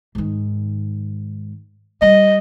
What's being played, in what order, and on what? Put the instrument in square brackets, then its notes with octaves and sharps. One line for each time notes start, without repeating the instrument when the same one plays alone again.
[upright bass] G#2 D#3
[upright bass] G3 [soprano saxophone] D#5